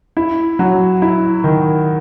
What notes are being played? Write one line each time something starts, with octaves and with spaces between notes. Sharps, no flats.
E4
F#3
E4
D#3